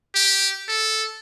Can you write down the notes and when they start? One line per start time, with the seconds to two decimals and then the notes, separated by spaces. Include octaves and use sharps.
0.15 G4
0.68 A4